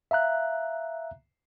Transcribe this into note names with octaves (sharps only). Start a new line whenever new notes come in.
E5 F5 A#5 F#6